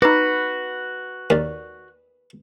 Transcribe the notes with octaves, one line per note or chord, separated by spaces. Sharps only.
D#4 F#4 B4 D6
D#2 A#4 D5